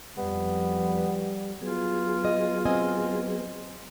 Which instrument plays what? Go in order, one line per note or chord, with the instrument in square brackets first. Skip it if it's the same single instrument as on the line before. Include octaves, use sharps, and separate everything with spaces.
[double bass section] F2 [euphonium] G3 [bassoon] B3
[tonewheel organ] F#3 B3 G#4 [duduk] F4
[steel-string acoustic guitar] D#5
C4 D#5 G#5